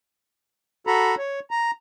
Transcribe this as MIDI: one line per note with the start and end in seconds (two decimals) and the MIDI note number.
0.87 1.15 66
0.87 1.15 69
0.87 1.15 82
0.87 1.15 83
1.18 1.40 73
1.51 1.71 82